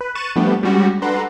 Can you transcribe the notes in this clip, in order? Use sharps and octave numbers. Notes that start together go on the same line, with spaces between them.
B4
C#6 F#6 A6 D#7 E7
F3 G3 A3 B3 D4 G4
G3 G#3 C#4 F#4 G4
D4 A4 B4 F#5 A#5 C6